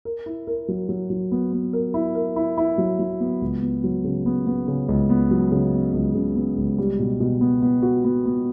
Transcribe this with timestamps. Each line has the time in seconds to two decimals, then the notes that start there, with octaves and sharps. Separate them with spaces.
0.05 A#4
0.26 E4
0.47 A#4
0.68 F#3
0.89 F#3
1.10 F#3
1.31 B3
1.52 B3
1.73 A#4
1.94 E4
2.15 A#4
2.36 E4
2.58 E4
2.78 F#3
2.99 F#3
3.20 B3
3.41 C#2
3.62 B3
3.84 F#3
4.04 C#3
4.26 B3
4.47 B3
4.68 C#3
4.89 C#2
5.10 B3
5.31 F#3
5.52 C#3
5.73 B3
5.93 C#2
6.14 C#3
6.36 B3
6.58 C#2
6.78 G3
6.99 B2
7.20 B2
7.41 B3
7.62 B3
7.83 F#4
8.04 B3
8.25 B3